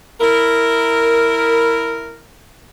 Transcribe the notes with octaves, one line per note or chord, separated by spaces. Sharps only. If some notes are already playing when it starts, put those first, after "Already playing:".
E4 A#4